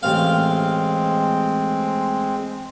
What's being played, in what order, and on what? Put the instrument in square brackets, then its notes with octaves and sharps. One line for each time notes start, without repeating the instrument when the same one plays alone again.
[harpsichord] A1 F5 [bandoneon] G#3 C4